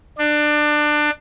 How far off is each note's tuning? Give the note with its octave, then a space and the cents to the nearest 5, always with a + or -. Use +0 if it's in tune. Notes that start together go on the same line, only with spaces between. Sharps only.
D4 +25